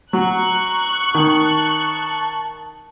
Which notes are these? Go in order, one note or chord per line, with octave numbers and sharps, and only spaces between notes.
F#3 A#5 C#6 F#6
D#3 A5